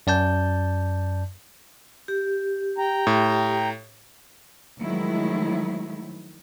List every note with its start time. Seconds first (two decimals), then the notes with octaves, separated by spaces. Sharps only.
0.07 F#2 D5 A5 G6
2.08 G4
2.78 G5 A#5
3.07 A2
4.82 D#3 F3 F#3 G#3 A3 E4